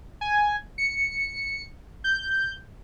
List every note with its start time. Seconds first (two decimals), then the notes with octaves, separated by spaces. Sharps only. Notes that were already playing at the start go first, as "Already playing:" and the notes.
0.21 G#5
0.78 C#7
2.04 G6